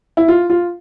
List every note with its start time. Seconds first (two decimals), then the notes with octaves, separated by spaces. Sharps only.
0.17 E4
0.28 F4
0.50 F4